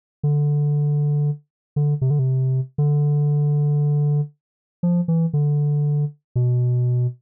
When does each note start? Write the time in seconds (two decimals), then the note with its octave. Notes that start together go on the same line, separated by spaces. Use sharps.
0.23 D3
1.76 D3
2.01 C3
2.10 D3
2.19 C3
2.78 D3
4.83 F3
5.08 E3
5.33 D3
6.36 B2